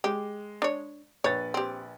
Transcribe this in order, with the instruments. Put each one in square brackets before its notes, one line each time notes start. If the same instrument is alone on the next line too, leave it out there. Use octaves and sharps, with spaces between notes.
[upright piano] G#3 [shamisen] G4
[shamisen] D4 C#5
[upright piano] A#1 B4 A6 [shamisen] C#5
[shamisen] C4 G4